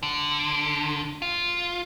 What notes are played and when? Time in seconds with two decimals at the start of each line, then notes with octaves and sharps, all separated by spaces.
0.03 D3
1.22 F4